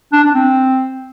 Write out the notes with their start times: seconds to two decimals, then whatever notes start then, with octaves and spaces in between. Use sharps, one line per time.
0.13 D4
0.24 D4
0.35 C4